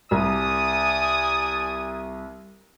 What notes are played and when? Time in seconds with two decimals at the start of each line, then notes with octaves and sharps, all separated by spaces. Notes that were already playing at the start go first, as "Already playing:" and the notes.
0.11 C2 D5 G#5 D#6